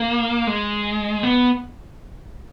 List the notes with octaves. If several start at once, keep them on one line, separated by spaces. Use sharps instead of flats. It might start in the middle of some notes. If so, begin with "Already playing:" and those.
Already playing: A#3
G#3
B3